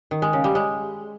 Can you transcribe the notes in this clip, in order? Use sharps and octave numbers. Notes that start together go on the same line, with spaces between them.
D#3
G#3
C#3
G3
G#3